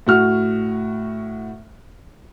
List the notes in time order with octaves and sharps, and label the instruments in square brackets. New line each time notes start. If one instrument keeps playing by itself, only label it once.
[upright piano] A2 F#4 F6